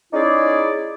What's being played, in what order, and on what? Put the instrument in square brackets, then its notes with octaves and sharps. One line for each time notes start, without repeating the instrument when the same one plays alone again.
[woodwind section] C#4 D#4 E4 G#4 D5